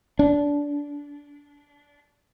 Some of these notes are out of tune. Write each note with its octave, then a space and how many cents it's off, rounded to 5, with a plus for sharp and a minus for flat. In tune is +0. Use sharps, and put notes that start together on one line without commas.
D4 -20